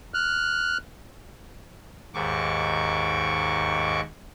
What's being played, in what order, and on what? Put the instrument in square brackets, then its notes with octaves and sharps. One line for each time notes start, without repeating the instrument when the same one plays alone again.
[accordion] F6 F#6
[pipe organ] D#2 G#2 C#6 D6